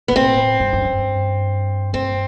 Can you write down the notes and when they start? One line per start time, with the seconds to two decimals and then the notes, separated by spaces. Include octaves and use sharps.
0.08 B3
0.11 G2
0.16 A2 C4
0.60 G2
0.73 F#2
0.85 G2
1.93 G2 C4